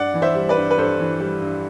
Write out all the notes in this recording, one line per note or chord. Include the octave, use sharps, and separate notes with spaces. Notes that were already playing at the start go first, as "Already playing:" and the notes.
Already playing: G2 D5 F#5
E3
C5 E5
G3
B4 D5
G2
B4
G2 A4 C5
E3
G3
G2